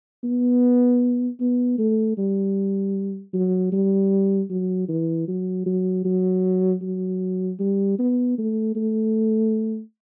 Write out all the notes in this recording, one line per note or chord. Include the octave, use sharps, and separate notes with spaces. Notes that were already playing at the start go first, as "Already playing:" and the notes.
B3
B3
A3
G3
F#3
G3
F#3
E3
F#3
F#3
F#3
F#3
G3
B3
A3
A3